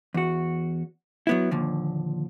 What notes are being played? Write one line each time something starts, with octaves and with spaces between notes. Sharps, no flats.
E2 F#4
F#3 B3 E4
D#2 A#2 D3 F3